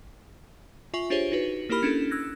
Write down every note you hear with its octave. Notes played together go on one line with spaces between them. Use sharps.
F4 E5 G#5 C#6 F#7
D4 F4 G4 G#4 C5 C#5
D#4 F#4 B4
A#3 E4 G4 A#4 B5 F6
C#4 D4 E4 A4
E6 F#6 G#6 A#6